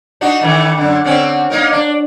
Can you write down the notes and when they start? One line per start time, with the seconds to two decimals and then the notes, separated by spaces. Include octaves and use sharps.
0.21 D4 D#4 F#4
0.41 D#3 E3 A3
0.78 F#2 D3
1.04 D3 C4 C#4
1.50 A#3 D#4 A#4
1.72 D4